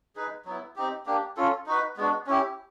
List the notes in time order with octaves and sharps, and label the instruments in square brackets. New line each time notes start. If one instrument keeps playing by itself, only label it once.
[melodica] D#4 G#4 B4
F#3 B3 E4
C4 D#4 G4
A#3 D4 G4
C#4 F4 A4
D#4 F#4 B4
G#3 B3 D4 F#4
C#4 E4 G4